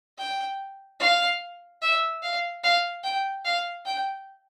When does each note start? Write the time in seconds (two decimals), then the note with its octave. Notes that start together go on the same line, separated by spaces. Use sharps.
0.18 G5
1.00 F5
1.82 E5
2.23 F5
2.63 F5
3.04 G5
3.45 F5
3.86 G5